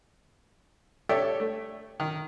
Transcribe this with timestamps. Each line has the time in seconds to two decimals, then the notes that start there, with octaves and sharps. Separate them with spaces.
1.09 G4 A4 C#5 D5 E5
1.40 A3
2.00 D#3